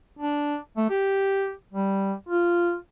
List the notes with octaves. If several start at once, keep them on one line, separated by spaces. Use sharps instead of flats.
D4
A3
G4
G3
F4